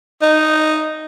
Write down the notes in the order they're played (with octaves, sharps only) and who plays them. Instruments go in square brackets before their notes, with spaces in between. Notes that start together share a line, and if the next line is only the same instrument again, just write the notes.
[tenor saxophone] D#4